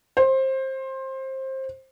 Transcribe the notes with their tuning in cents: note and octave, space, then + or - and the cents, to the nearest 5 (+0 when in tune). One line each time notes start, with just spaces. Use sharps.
C5 +20